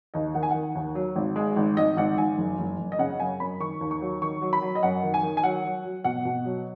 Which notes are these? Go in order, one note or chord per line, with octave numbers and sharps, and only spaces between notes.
D#2 D#5
D#3 F#5
G#5
D#3 F#5
D#2
F#3
G#1
G#3
G#1
G#1 D#5
G#1 F#5
G#1 G#5
F#1
F#1
F#1
D#5
C#3 F#5
F#2 G#5
F#2 B5
D#3 C#6
D#2
C#6
F#3
D#3 C#6
F#3
B5
F#3
D#5
F#2 F#5
D#3
G#5
D#3
G#5
F#3 F#5
F#3
F#3
B2 F#5
B2
F#3